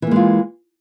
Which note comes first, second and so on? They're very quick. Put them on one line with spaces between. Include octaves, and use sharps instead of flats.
E3 A#3 G#3 F4